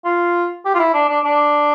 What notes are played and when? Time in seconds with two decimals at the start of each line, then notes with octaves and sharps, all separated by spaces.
0.05 F4
0.65 G4
0.74 F4
0.79 E4
0.94 D4
1.09 D4
1.24 D4